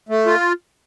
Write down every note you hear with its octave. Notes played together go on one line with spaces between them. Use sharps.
A3
F4